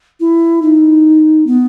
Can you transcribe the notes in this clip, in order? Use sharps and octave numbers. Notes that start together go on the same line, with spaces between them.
E4
D#4
B3